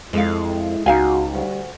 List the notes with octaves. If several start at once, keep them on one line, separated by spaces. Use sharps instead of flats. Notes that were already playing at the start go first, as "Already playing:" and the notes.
F2 G#3 E4 A4 F5
C#2 D#4 F#4 F5 G#5
D2 G3